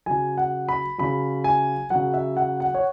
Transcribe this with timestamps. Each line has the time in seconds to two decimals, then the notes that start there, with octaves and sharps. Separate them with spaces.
0.06 C#3 F#3 G#5
0.38 F#5
0.69 B5
0.98 C#3 F#3 B5
1.44 G#5
1.90 C#3 F#3 F#5
2.14 E5
2.37 F#5
2.60 F#5
2.75 C#5